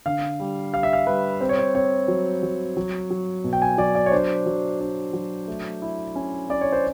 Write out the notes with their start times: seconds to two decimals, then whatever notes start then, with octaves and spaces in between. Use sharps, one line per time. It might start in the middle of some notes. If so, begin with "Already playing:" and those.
0.06 D3 F5
0.40 G3
0.73 G3 F5
0.83 E5
0.93 F5
1.07 G3 B4
1.41 C4 C5
1.49 C#5
1.58 C5
1.75 C4 C#5
2.08 F#3
2.43 F#3
2.77 F#3
3.10 F#3
3.44 B2
3.53 G5
3.62 G#5
3.78 F#3 D5
3.95 D5
4.06 C#5
4.12 D4 C5
4.46 F#3
4.80 D4
5.13 F#3
5.48 A3
5.82 E4
6.16 C#4
6.50 C#4 D5
6.61 C#5
6.73 C5